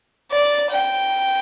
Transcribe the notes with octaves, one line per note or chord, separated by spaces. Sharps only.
D5
G5